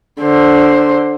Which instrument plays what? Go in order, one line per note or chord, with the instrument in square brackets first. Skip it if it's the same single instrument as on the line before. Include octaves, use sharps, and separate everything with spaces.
[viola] D3 C5